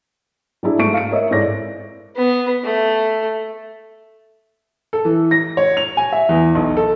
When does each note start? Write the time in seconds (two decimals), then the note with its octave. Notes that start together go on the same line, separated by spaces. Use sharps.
0.63 F#3 D4 E4 G#4
0.79 G#2 A3 C#6 D7
0.94 F5 C#7 D7
1.11 A#4 C#5 D#5 E5
1.31 G#2 E4 A4 C#5 D5 A#6
2.17 B3
2.64 A3
4.93 A4
5.05 E3
5.31 A#6
5.57 C#5
5.77 F7
5.97 G#5
6.12 E5
6.29 E2
6.55 B1
6.77 A4